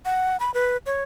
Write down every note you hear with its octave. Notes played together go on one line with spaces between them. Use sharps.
F#5
B5
B4
C#5